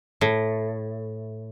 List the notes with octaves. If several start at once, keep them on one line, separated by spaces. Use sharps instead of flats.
A2